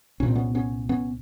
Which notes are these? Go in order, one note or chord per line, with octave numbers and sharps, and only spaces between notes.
C2 A#2 C4 C#4
B3 C#4
B3 C#4
B3 C#4